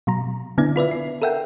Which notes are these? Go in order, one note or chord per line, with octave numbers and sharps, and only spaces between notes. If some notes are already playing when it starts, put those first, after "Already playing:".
B2 F#3 A#5
D3 B3 D4 E4 D5
F4 B4 D5 E5
C7
A4 A#4 E5 F#5 G5